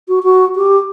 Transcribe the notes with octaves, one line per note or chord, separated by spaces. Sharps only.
F#4
F#4
G4